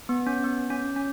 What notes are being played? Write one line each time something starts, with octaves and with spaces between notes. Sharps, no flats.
B3
C#4
B3
C#4
C#4